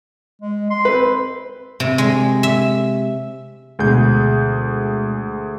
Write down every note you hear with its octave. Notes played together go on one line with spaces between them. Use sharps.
G#3
C6
C4 B4
C3
G#3
E5
D2 B2 G#3 G#4 G6